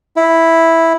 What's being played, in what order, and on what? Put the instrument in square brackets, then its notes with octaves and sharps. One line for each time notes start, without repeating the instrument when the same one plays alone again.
[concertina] E4